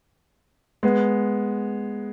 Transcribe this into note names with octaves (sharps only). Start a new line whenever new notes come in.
G#3 B3